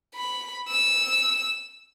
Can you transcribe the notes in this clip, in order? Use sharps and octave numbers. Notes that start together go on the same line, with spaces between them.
B5
E6